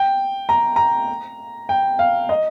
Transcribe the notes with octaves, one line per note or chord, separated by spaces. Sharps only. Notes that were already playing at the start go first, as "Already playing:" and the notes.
Already playing: G5
A#5
A#5
G5
F5
D#5